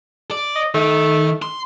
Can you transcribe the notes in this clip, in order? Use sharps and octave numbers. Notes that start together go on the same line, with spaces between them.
D5
D#5
D#3 A3
C6